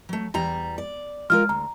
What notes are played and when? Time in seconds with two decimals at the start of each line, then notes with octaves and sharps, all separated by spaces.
0.09 F#3 A3
0.34 E2 G3 A#5
0.78 D5
1.30 G#3 F4 A#4 F6
1.49 D2 A#5